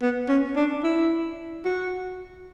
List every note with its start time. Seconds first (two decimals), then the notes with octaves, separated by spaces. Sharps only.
0.02 B3
0.29 C#4
0.56 D4
0.83 E4
1.65 F#4